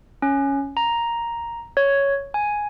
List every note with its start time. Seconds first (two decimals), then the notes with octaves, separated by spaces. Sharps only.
0.22 C#4
0.77 A#5
1.77 C#5
2.34 G#5